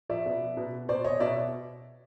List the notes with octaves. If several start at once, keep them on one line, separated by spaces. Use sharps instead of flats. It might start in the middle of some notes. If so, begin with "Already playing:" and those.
F3 D5 E5
B2
B2
B2 C5 D5
C#5 D#5
B2 D5 E5